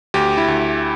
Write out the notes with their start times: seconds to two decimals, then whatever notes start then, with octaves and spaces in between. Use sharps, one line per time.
0.14 D2 G4
0.37 E4
0.48 D2